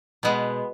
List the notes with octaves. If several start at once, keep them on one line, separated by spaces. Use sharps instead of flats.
B2 G#3 B3